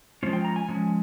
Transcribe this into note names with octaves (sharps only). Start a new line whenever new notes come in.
F3 G#3 C#4 F4 C5
G5
A#5
G#5
F3 G#3 C#4